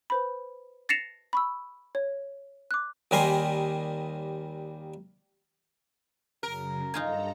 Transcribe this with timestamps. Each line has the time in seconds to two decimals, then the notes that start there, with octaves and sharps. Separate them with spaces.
0.10 B4 C5 B5
0.89 A6 A#6 C7 C#7 E7 F7
1.33 B5 C#6 E6
1.95 C#5
2.71 D6 F#6
3.11 D#2 D#3 G3 A#4 G#5 C6
6.43 F#2 C#3 A#4
6.94 G2 D#4 F4 A4 G#5 A#5